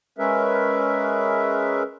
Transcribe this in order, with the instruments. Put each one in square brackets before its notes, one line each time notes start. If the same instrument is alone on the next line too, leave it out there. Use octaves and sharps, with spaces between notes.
[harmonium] G#3 C#4 G#4 A#4 B4 E5